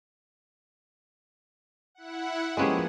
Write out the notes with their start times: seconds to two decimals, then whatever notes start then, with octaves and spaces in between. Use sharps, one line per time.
1.95 E4 F#5
2.57 F3 G#3 A#3 B3 C#4 G4 G#4